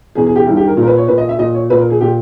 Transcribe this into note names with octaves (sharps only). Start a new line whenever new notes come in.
E2 B2 G#4
G#4
G4
G2 D#3 E4
G4
A#4
A#2
A#4
B4
C#5
A#2 B4
D#5
E5
A#2 D#5
C#5
A#2 B4
A#4
G#4
A#2 G4